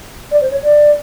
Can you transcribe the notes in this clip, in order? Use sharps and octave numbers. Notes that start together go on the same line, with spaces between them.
D5
C5
C#5
D5